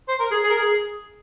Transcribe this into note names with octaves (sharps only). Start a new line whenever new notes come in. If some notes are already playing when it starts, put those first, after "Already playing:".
C5
A#4
G#4
G#4
A#4
G#4